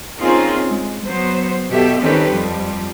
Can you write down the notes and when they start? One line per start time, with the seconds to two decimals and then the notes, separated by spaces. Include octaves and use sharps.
0.19 A#3 C4 C#4 D#4 F4 G#4
0.68 G#3
1.04 F#3 B3 C5
1.69 B2 G4 A4 E5
2.00 D#3 C4 C#4 G4 A4 B4
2.31 F2 F3 G3